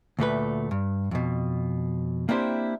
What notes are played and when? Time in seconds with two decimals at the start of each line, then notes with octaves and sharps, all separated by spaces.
0.19 D2 A#2 A3 B4
0.71 G2
1.11 F2 B2
2.29 A#3 C4 D4 E4 G4 C5